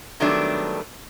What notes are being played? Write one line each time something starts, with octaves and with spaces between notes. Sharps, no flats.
D#3 F#3 G3 A3 B3 D4